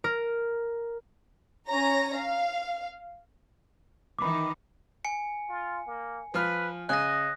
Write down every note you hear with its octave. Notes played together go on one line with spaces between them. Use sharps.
A#4
C#4 C#5 A#5 A#6
F5
D#3 E3 D#4 B5 D6
G#5 C#7
F4
A#3
F3 B4 F6
C#3 D#5 F#6 A#6